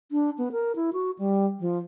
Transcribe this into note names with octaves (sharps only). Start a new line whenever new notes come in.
D4
B3
A#4
E4
F#4
G3
F3